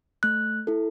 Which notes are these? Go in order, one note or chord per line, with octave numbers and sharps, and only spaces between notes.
A3 F#6
E4 A4